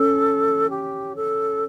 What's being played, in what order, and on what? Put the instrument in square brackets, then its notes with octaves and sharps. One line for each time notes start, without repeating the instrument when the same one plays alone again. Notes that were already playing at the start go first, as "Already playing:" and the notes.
Already playing: [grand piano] C#4 [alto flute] A4
[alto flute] G4
A4